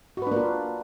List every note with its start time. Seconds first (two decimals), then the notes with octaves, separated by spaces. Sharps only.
0.17 F#4
0.22 B4
0.27 D4
0.32 A#3
0.36 F4